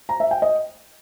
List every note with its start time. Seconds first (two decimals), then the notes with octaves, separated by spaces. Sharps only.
0.09 A#5
0.20 E5
0.31 G5
0.42 D#5